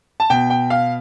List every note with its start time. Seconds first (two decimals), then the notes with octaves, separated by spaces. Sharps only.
0.20 A5
0.30 B2 G5
0.50 G5
0.70 F5